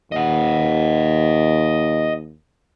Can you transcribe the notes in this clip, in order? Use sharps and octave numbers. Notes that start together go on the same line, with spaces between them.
D#2 D#5 F#5